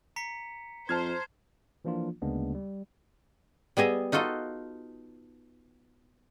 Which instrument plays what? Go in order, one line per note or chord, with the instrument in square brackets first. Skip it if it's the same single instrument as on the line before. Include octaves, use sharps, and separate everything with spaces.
[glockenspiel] A#5 B6 C#7
[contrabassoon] F2 [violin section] C5 [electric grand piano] A5 F6 G#6
[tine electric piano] E3 F3 A#3 D4 F4
D2 C#3 G#3 A#3 B3 D4
G3
[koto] G3 B3 G#4 D#5 E5
D#4 F4 F#4 A4 D#5